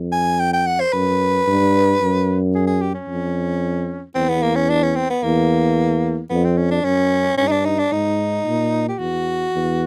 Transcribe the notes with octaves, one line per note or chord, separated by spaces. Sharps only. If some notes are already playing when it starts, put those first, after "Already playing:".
Already playing: F2
G#5
G5
G5
F#5
C5
F#2 B4
G2
F#2
G#4
G#4
G4
C#4
F2
E2 C4
B3
A#3
C#4
D4
C#4
C4
B3
E2 A#3
F2 B3
C4
C#4
D4
F#2 C#4
G2 C#4
D#4
D4
D#4
D4
G#2 D#4
A#2
G4
E2 F#4
E2